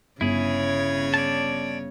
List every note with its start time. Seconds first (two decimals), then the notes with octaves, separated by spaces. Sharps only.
0.21 G1 C#3 E4 G#4 C#5
1.14 D5 A5